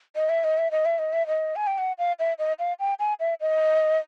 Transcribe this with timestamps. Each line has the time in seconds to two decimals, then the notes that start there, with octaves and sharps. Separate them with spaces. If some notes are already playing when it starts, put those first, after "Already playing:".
0.16 D#5
0.29 E5
0.44 D#5
0.58 E5
0.71 D#5
0.85 E5
0.99 D#5
1.13 E5
1.27 D#5
1.56 G#5
1.67 G5
1.78 F#5
1.98 F5
2.19 E5
2.39 D#5
2.59 F5
2.80 G5
3.00 G#5
3.20 E5
3.41 D#5